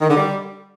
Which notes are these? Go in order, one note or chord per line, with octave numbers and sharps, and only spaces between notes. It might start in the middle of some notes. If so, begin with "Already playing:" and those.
D#3
D3
G3